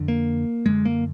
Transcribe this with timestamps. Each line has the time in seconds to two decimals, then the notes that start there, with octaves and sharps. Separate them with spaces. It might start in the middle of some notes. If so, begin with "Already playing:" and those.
Already playing: F2 D3
0.08 A#3
0.66 F#2 D3 G#3
0.85 A#3